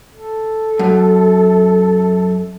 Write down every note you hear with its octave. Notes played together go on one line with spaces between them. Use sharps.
A4
F#2